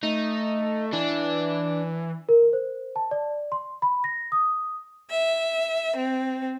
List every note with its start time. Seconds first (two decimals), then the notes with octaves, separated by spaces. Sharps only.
0.03 A3 D#4
0.93 E3 D4
2.29 A#4
2.53 C5
2.96 A5
3.11 D5
3.52 C6
3.82 B5
4.04 A#6
4.32 D#6
5.11 E5
5.97 C4